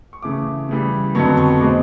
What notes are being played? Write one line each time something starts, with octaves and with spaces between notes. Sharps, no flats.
C#6
C#3 E3 A3 D6
C#3 E3 G3
F2 D3 F#3 B3 C#6
C#6
B2 G#3 C4 D6